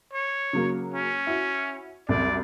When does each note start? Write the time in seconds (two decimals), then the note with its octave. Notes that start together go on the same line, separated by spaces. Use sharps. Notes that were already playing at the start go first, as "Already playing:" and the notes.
0.13 C#5
0.53 C#3 F#3 A#3
0.95 C#4
1.27 E4 F#4
2.09 C2 F#2 A3 D5